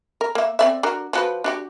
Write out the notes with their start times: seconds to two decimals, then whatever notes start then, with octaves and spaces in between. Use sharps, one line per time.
0.21 A#4
0.35 A#3 E5
0.59 C4 D5 E5
0.83 D4 F#4 A#4
1.13 F3 F#4 B4
1.44 D4 F#4 G4